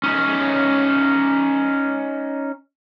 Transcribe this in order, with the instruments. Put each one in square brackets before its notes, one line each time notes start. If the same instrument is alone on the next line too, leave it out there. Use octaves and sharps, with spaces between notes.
[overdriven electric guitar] C#4 D#4